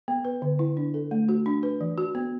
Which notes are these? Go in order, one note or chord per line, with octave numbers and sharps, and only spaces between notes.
B3
B4
D3
E4
D4
A4
A3
F#4
D4
B4
E3
F#4
B3